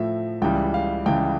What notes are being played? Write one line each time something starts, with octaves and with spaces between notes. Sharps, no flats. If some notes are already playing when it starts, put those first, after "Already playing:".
Already playing: A2 F3 E5
C#2 C#3 E3 G3 G5
F5
C#2 C#3 E3 G3 G5